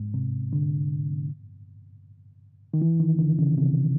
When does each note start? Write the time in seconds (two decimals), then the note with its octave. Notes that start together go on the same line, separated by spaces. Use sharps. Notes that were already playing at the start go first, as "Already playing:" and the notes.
Already playing: G#2
0.14 C3
0.53 D3
2.74 D#3
2.82 E3
3.00 D#3
3.19 D3
3.39 C#3
3.58 C3